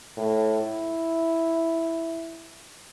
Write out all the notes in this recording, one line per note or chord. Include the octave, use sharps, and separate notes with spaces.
A2
E4